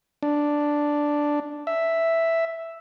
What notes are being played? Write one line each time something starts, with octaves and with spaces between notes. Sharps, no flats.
D4
E5